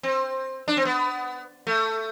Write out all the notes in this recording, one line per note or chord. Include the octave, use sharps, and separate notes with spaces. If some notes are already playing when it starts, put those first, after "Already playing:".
C4
D4
C4
B3
A3